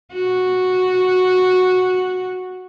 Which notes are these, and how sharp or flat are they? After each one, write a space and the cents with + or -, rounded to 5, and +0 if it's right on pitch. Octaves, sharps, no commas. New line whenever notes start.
F#4 -5